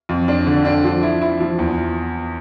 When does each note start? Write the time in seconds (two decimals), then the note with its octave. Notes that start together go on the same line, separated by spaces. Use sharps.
0.09 F2
0.28 D4
0.46 D3
0.65 D4
0.84 F3
1.03 E4
1.21 E4
1.40 F3
1.59 E2